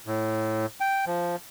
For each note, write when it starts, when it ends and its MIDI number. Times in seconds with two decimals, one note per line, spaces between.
0.06 0.66 45
0.80 1.05 79
1.06 1.36 53